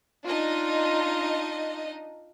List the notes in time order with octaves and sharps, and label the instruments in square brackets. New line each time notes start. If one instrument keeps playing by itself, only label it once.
[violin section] D4 D#4 D#5 [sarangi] F4